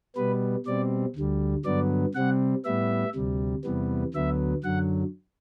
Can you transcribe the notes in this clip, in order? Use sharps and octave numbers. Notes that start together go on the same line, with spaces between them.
B2 G3 B3 B4
B2 G3 C4 D5
D2 D3 G3
G2 D3 F#3 B3 D5
C3 G3 C4 F#5
A2 G3 B3 E5
D2 C3 G3
E2 C3 E3 G3 B3
D2 D3 F#3 B3 E5
F#2 D3 F#3 F#5